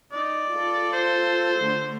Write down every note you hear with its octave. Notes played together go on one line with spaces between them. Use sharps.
D#4 D5
F4 A4
C5
D3 A3